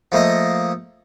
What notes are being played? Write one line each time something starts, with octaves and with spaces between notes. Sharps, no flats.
F3 A3 A#3 D#5